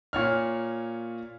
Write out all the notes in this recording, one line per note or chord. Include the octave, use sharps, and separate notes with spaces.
A#2 C#5 F6